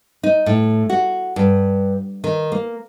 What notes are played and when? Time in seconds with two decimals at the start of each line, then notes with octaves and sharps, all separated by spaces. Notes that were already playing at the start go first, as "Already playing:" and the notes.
0.23 D#4
0.46 A2
0.89 F#4
1.36 G2
2.24 D#3
2.52 A#3